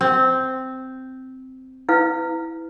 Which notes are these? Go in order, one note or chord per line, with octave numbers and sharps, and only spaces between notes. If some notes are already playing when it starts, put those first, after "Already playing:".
C4
E4 B4 F5